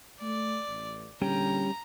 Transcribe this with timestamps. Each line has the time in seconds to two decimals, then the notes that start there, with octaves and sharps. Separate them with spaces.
0.22 A3 D5
0.67 A1
1.22 E2 A#2 D3 G3 C#4 G4 A#5